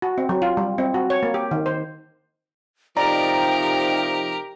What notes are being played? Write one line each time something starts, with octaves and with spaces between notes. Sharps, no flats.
F#4
C4
F#3
F4
G3
C4
F#4
C#5
A#3
G4
D#3
C5
C3 F3 D#4 G4 A#4 D5 G5 A#5